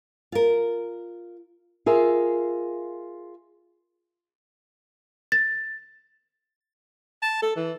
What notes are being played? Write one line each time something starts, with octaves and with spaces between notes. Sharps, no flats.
F4 A#4
F4 G#4 A#4 E5
A6
A5
A4
E3